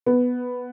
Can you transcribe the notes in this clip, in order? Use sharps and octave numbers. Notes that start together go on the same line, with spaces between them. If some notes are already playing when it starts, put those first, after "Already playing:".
B3